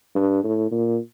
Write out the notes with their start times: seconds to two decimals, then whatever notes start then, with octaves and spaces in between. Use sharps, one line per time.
0.15 G2
0.44 A2
0.72 A#2